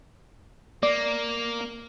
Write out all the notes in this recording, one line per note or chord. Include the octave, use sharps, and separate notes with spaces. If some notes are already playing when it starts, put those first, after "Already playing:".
A#3 D5